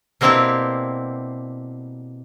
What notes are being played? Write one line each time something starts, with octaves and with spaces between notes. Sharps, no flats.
B2 A#3 C4 D4 E4 G4